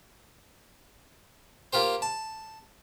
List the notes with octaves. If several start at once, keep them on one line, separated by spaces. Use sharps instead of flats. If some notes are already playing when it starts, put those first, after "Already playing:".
A#3 F4 G4 C5
A5